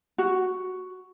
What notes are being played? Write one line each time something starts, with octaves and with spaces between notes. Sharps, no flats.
F#4